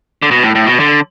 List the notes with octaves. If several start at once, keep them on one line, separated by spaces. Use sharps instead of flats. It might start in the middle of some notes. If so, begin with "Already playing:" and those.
D3
B2
A2
A2
B2
D3